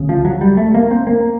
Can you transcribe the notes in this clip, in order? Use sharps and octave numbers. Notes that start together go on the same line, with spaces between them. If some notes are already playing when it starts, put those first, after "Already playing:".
Already playing: D2 C#3
F3
F#3
G3
A3
A#3
C4
A#3